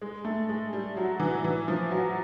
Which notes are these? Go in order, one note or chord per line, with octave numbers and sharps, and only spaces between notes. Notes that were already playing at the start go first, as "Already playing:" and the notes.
G#3
A3
G#3
G3
F#3
E3
E3
F3
F#3